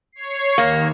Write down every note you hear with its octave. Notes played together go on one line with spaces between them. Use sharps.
C#5 C7
D#2 A#3